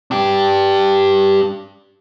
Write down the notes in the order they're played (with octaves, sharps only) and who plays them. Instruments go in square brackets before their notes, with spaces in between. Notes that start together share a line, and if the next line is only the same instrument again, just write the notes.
[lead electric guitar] D4 G4